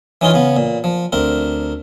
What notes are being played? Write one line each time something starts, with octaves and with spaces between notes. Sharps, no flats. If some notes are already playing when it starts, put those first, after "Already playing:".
E3 C#4 D#4 F4
C#3 B3
A#2
F3
D2 C4 A#4